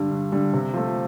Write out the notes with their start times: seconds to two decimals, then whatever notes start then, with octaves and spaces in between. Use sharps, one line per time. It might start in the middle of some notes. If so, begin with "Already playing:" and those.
Already playing: G2 D3 G3
0.11 G2
0.32 D3 G3
0.53 C3
0.74 F3 A3